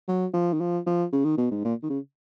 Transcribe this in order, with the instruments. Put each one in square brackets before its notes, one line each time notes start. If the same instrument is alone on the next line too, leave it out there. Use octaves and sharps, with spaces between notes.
[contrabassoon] F#3
F3
D#3
F3
F3
C#3
D#3
B2
G#2
A#2
D#3
C#3